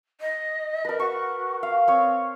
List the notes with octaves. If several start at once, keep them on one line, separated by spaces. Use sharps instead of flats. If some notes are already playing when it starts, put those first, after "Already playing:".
D#5
A#4 B4
F#4 C#6
F5
C4 C#5